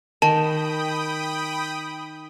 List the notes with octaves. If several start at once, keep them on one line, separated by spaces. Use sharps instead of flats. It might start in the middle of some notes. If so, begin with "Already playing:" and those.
D#3 G5 A5 B5 D#6